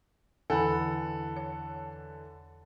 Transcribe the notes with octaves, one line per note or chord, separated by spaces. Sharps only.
E2 D3 E3 A4 F#5 B5
C#5